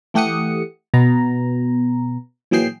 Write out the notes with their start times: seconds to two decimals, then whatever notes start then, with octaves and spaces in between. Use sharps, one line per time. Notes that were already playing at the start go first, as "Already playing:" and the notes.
0.14 E3 A3 G4 F#5 D#6 C#7
0.94 B2 B3 A#5
2.51 A#2 E3 F#3 G#4 G5 C7